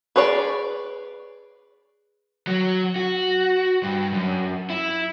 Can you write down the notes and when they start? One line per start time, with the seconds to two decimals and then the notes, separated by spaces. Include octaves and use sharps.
0.16 G#4 B4 C#5 D5
2.47 F#3
2.96 F#4
3.83 G2
4.12 F#2
4.70 E4